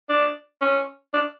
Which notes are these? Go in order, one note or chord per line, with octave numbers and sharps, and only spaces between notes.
D4
C#4
D4